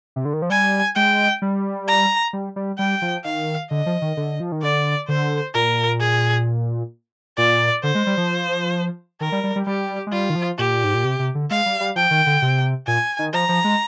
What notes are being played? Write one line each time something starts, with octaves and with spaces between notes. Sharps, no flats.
C3
D3
D#3
F3
G3 G#5
G#3 G5
G3
A#5
G3
G3
G3 G5
F3
D#3 F5
D3 D#5
F3
D#3
D3
F3
D#3
D3 D5
D3 C5
A#2 A#4
G#4
A#2 D5
D3 C5
G#3
G3
F3
D#3 A#4
G3
G3
G3
G3 G4
G#3
G3 F4
D#3
F3
A#2 G4
G#2
A#2
C3
C3
D3
G#3 F5
G3
G3
F3 G5
D#3
D3
C3
A#2 G#5
D#3
F3 A#5
F3
G#3